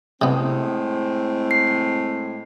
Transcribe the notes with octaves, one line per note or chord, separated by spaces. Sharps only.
A2 C3 G#3 B3 C4
C7